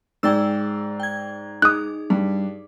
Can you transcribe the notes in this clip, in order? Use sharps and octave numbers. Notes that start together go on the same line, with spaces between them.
G#2 G#4 D5 G5 E6
G5 G#6
D#4 G#4 D6 D#6 F#6
G2